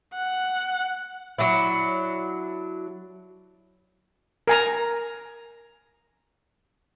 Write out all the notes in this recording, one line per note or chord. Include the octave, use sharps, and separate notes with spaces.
F#5
F#3 D4 E4
A#4 G#5 A#5